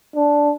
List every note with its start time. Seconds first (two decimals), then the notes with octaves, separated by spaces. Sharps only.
0.16 D4